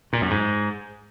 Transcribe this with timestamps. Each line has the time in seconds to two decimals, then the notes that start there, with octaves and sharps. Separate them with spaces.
0.13 A#2
0.21 F#2
0.30 G#2